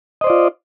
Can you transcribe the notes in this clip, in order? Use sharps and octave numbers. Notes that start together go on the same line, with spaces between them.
F4 C5 D5 D#5